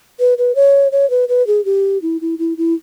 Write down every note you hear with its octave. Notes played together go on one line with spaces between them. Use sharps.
B4
B4
C#5
C#5
B4
B4
G#4
G4
E4
E4
E4
E4